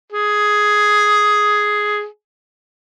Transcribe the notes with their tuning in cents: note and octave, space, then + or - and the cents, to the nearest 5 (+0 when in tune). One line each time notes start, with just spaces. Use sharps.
G#4 +5